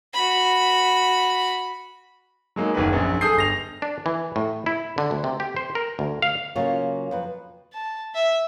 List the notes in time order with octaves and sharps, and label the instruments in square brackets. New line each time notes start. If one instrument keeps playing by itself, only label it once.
[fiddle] F#4 B5
[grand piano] F#3 G#3 A#3 D#4
F#1 D#2 D#3 B4
A#1 F#2
G#4 A4 D#6 G6 C7
G1 A#6 F7
[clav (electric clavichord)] D4
E3
A2
E4
D3
D2
C3
G4
C5
A#4
D2
F5
[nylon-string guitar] C#3 F#3 A#3 F4 C#5
F2 B4
[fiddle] A5
E5